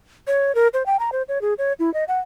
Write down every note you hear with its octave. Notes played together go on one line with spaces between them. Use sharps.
C#5
A#4
C5
G5
A#5
C5
C#5
G#4
C#5
E4
D#5
F#5